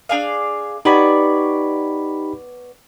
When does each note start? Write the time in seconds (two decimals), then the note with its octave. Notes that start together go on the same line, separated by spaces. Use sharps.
0.09 D4 G#4 F5
0.85 B3 D#4 G4 C#5 D5 B5